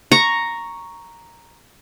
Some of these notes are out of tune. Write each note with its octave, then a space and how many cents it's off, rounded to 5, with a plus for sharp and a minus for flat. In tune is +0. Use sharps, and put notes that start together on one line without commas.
A#5 +0 C#6 +0